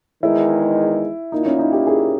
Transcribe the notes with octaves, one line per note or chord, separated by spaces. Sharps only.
E2 D#3 G#3 D#4 E4
A#2 A#3 D#4 E4
C#4
D#4
G4
G#4